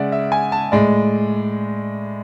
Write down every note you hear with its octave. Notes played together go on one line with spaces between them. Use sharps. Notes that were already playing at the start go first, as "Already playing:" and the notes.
Already playing: C#3 G#3 D5 E5 F#5
E5
G#5
A5
A2 G#3 D5